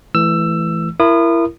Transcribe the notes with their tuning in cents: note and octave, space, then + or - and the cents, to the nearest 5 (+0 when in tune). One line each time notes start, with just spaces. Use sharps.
E3 +5 A3 -25 E6 +15
E4 +25 A#4 +0 D#6 -30